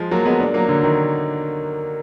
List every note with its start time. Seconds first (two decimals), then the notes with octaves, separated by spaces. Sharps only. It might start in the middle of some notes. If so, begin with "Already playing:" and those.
Already playing: F3 G#3
0.11 F#3 A#3
0.26 G#3 B3
0.40 A#3 D4
0.54 F#3 A#3
0.69 D3
0.83 D#3